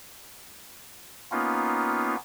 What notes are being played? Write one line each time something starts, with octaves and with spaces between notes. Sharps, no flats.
A#3 B3 C#4 D#4 F4